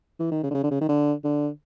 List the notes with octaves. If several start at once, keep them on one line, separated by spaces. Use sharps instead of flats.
E3
D#3
C#3
D3
C#3
D3
C#3
D#3
D3
D3